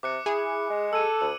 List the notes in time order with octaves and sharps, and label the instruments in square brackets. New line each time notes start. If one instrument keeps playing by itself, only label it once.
[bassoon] C3 [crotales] D6 F#6 C#7
[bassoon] E4 [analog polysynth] G#4
[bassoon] G#3
[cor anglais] A4 [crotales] E6 G#6 D#7
[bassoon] D2 [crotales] F#7